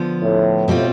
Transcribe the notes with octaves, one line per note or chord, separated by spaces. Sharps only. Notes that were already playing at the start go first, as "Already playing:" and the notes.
Already playing: D3 F3 B3
A2
B2 G3 C4 F4